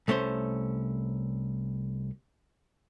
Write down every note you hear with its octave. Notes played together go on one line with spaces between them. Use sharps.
C2 A3 C#4 C5